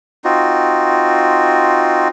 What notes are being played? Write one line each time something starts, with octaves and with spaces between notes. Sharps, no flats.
C4 D#4 F4 F#4